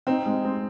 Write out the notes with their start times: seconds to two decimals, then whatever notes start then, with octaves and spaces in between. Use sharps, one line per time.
0.07 C4 D#4
0.26 G#3
0.45 C4